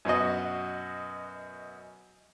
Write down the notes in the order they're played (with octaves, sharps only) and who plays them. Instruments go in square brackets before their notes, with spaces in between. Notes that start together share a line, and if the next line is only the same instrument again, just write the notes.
[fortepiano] F#2 B2 F#4 D#5